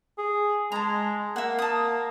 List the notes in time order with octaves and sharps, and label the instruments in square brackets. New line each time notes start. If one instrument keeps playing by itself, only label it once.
[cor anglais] G#4
[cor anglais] G#3 [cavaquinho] A5 A#5
[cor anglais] A#3 [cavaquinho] E5 F#5
[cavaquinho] A5 D#6